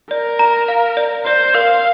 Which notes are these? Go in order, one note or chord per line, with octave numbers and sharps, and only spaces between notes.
A#4 D5
A#5
F5
D5
C5 D5
A#4 F5